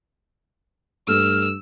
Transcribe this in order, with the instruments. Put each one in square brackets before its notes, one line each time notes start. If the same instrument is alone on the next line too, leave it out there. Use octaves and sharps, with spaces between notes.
[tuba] G2 [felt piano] A3 [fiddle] E6 [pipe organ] F6